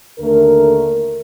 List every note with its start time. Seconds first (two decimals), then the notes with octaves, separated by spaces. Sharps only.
0.19 D#2 D3 A3 A#4